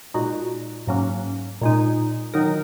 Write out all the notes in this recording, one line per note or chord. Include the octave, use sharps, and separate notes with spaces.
A#2 G#3 D#4 F#4
G#2 F#3 A#3 C#4
A#2 G#3 D#4
D#3 F#3 D#4 A#4